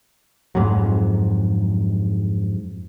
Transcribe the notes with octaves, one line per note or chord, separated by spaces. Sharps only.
F2 G#2 F#3